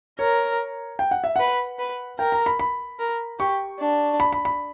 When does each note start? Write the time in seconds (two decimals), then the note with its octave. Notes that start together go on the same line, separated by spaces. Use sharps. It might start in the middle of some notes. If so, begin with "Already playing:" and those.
0.19 A#4 C#5
0.99 G5
1.11 F#5
1.24 E5
1.36 B4 F#5
1.79 B4
2.19 A#4 G5
2.32 A#5
2.46 B5
2.59 B5
2.99 A#4
3.39 G4 C#6
3.79 D4
4.20 B5
4.33 B5
4.45 B5